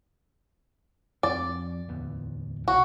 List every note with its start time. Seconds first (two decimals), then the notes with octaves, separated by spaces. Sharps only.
1.23 F2 F3 C4 D5
1.89 D1 E2 B3
2.68 B1 C3 F#4